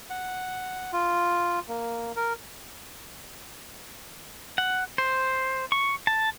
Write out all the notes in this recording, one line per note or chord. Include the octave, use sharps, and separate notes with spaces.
F#5
F4
A#3
A#4
F#5
C5
C#6
A5